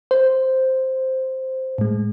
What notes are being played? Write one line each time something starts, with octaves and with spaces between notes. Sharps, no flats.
C5
A2 G#3